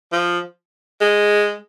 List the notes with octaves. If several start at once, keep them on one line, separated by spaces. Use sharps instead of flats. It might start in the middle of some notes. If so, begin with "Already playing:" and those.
F3
G#3